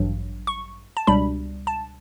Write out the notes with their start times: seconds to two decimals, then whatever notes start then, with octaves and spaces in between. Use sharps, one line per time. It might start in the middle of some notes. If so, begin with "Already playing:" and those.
Already playing: A1 G2 F#3
0.47 C#6
0.97 A5
1.07 C#2 B2 G3 D4 B5
1.67 A5